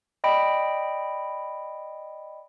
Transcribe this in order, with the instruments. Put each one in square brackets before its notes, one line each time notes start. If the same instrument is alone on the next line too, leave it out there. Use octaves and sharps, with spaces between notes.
[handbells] D5 D#5 G5 B5 D7